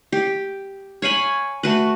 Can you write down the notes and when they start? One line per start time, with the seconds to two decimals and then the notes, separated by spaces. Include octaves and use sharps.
0.12 G4
1.02 C#5 F5 G#5 B5
1.63 A3 F#4 B4